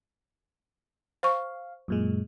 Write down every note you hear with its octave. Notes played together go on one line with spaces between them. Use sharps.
C5 F5 C#6
F#2 A#2 G#3